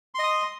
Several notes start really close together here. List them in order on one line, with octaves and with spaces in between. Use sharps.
C6 D#5 D#6